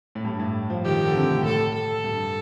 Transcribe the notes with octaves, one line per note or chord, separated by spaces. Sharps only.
A2
G2
A2
F3
D#3 G4
D3
C3
A2
A2 A4
A4
G2